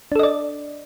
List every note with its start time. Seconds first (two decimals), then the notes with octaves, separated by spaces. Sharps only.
0.12 D4
0.16 A4
0.19 D#5
0.23 D5